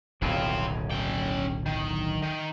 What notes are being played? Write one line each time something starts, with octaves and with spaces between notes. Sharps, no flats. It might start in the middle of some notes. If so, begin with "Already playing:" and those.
D1 B1 C#3 C4 F4
C#4 G5
D#3
D#3